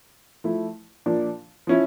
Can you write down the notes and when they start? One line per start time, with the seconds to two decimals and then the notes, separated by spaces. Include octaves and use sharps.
0.44 F3 A3 E4
1.06 A#2 F3 A#3 D4
1.67 F3 C#4 E4